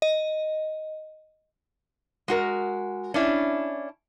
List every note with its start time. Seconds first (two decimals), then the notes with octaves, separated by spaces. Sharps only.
0.02 D#5
2.28 G#3 F#4 A#4
3.14 C#4 D4 E4